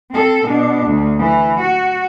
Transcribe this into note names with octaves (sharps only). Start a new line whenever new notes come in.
C4 A4
B2 D4
D2
E3
F#4